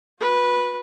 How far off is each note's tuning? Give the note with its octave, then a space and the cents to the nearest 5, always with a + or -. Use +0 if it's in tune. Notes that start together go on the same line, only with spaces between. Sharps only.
F#4 -35 B4 -10